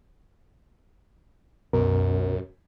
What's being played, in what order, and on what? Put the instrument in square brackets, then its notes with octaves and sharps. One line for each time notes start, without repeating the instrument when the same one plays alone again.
[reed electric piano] C2 B2 A#4 [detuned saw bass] F#2